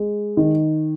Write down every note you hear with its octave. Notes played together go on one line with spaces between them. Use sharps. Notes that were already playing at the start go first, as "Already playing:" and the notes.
Already playing: G#3
D#3